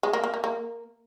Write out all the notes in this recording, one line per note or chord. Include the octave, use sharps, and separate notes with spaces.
G#3
A#3
A#3
A#3
A#3